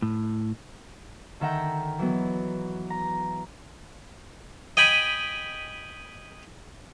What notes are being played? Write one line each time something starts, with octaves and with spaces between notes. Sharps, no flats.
A2
D3 D#3 E5 F#5 G5 A#5
E3 F#3 B3
A#5
D#5 G5 G#5 B5